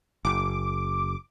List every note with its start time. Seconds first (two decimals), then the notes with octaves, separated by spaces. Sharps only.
0.25 F#1 D6